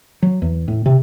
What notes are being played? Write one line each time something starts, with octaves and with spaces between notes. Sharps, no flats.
F#3
E2
A2
C3